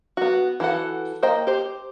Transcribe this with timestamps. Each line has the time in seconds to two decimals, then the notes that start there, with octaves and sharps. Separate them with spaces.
0.17 B3 F#4
0.60 E3 F#4 A4 F#5
1.23 A#3 C5 D#5 G5
1.47 G4 C5